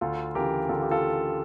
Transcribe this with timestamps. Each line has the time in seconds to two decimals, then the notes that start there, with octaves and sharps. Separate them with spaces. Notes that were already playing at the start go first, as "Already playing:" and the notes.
0.01 D2 F4 A4
0.35 C#3 E3 G4 A#4
0.69 D2 F4 A4
0.83 G4
0.91 F4 A4